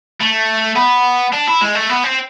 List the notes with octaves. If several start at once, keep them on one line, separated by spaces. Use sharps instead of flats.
A3
B3
D4
E4
G#3
A3
B3
C4